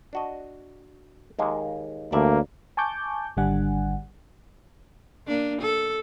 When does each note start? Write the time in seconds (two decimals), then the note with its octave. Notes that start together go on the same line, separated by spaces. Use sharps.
0.13 D4 F#4 D#5
1.39 D#2 G#3 A#3
2.12 D2 G2 A#3 D5 E5
2.77 G#5 A5 C#6 D6 G6
3.37 G#1 D3 G3 D4 F#5 G#5
5.27 A#3 D4
5.61 A4